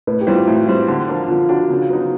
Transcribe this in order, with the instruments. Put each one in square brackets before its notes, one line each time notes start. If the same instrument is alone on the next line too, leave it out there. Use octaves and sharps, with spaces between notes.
[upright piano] A2 [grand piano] B4
[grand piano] G4
[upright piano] E3 G3 C4 [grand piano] F4
[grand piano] F#4
[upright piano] A2
E3 G3 C4
D3
F3 A#3 D4
[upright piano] D3 [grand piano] F4
[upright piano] F3 A#3 D4 [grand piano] F#4
[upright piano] C#3
F#3 B3 D#4